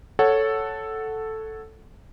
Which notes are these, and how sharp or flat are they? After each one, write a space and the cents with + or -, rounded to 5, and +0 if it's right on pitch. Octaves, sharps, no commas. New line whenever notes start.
A4 +0 C#5 +0 F#5 +0